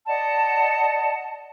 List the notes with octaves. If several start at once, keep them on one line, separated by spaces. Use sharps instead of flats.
D5 D#5 F#5 A5